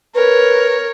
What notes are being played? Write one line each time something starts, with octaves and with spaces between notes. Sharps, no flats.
A#4 B4 C#5